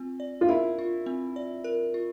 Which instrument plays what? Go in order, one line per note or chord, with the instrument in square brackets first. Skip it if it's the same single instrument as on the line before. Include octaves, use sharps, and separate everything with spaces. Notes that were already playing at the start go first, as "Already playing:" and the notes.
Already playing: [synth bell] C4 F4
D5
[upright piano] F4
[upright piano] E4 [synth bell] A#4
[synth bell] F4
C4
D5
A#4
F4